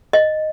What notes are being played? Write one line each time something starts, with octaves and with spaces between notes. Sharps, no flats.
D#5